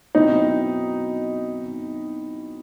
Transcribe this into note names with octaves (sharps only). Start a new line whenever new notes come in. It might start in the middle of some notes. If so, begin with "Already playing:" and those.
B2 F#3 C4 D#4 E4